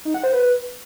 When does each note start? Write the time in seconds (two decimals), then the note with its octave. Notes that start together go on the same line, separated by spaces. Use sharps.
0.05 D#4
0.14 F#5
0.23 C5
0.33 B4